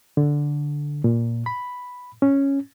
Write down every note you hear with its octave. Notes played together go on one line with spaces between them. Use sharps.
D3
A#2
B5
C#4